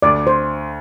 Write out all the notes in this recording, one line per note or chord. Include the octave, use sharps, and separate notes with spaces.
D2 D5
C5